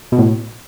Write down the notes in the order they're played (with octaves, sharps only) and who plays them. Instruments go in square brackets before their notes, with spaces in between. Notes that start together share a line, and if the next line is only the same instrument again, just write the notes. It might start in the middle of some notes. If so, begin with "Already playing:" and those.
[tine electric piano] B2
A2